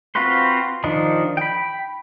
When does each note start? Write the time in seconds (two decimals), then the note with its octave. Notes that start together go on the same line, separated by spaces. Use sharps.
0.15 C4 F4 F#4 B4 C5
0.84 D#3 F3 D4 D#4
1.37 G5 B5